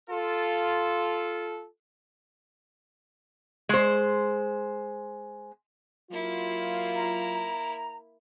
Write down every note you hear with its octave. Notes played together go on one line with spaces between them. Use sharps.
F4 A4
G#3 C5
F#3 A#3 E4 F4
A#5